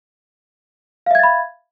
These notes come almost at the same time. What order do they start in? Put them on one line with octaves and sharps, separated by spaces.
F5 E5 G#6 A6 B5